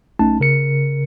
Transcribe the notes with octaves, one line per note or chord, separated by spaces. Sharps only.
B1 A3 C#4 D#4 A5
C#3 A#4 C#7